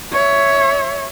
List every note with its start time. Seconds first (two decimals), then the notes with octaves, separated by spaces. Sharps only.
0.12 C#5 E5